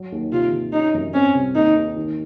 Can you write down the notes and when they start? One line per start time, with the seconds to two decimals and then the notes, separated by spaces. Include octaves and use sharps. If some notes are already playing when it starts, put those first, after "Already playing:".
Already playing: F#3
0.12 D#2
0.32 C3 F4
0.53 C3
0.73 C#4 D#4
0.94 F#2
1.14 C4 C#4
1.35 C2
1.55 D#2 D#4
1.76 D#2
1.96 D#3